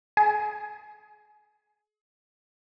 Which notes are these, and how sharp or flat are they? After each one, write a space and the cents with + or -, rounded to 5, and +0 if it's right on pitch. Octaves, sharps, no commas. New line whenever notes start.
G#4 +40